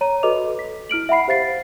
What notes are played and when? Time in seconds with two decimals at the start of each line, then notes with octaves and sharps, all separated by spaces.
0.01 C#5 A#5 D#7
0.23 F#4 A4 B4 D#5 D6 F7
0.59 B6
0.89 E4 F6 D7 F#7
1.09 E5 F#5 B5 C7
1.28 G4 C5 F5 A6 C7